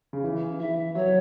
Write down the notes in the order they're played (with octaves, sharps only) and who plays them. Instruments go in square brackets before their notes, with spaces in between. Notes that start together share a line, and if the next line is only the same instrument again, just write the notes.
[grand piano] C#3
E3
[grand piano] E3 [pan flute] E5
[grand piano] F#3 [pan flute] C#5